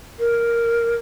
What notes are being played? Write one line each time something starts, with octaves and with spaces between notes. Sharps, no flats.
A#4